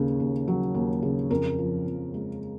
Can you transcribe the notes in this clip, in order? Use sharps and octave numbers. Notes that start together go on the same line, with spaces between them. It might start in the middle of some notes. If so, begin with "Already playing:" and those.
Already playing: D#2 C#3
D#2
F#3
D#2
C#3
F2 A#4
F3
F2
G#3